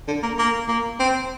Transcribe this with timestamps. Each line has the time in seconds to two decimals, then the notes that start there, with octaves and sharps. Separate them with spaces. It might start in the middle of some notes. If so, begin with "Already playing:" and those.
0.08 D3
0.23 A#3
0.39 A#3
0.68 A#3
0.99 C4